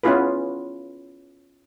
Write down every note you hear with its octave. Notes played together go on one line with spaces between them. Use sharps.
B3 C#4 E4 F4 G#4 B4